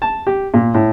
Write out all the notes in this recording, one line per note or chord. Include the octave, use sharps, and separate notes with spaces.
A5
G4
A#2
A2